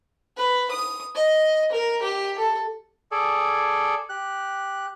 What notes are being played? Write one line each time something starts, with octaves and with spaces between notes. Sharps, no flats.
B4
D#6
D#5
A#4
G4
A4
G#4 A4 D5
G4 F#6